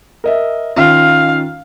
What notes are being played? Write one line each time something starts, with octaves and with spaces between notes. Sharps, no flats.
A#4 D#5 E5
D#3 C#4 F4 F5